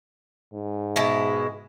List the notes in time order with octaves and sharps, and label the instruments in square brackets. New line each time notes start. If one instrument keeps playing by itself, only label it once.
[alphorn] G#2
[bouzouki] B2 G#3 E4